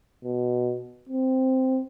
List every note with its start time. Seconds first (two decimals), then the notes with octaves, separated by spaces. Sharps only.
0.24 B2
1.09 C4